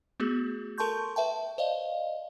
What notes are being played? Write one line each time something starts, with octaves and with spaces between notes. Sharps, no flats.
A3 B3 F#4 G#4
A4 A#4 A5 C6 C#6 G6
B4 E5 G5 A5
C5 D5 D#5 F5